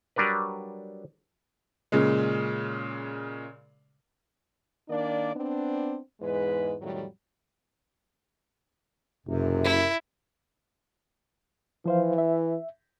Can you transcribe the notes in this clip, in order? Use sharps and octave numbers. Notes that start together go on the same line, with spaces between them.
F#3 G3 D4 A#4 B4
A#2 C#3 G#3
D#3 A#3 D4 D5
B3 C4 D4
E2 G#2 G#3 B4
F2 A2 D#3 F#3 G3
F#1 F#2 C3
E4
E3 F3 C5 F5
E5